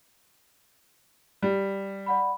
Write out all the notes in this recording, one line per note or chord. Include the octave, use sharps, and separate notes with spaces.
G3
D5 F#5 B5